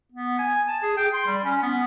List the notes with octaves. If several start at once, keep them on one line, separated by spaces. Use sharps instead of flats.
B3
G#5
A5
G#4
G5
C6
G3
C#4
B3